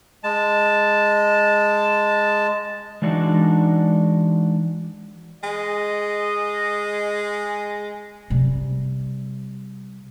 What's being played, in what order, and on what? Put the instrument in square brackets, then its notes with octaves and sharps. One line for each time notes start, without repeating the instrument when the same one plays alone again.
[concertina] G#3 A5
[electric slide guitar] E3 G#3 D4 D#4 F#4 D5
[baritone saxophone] G#3 [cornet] D#5
[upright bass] C3 G3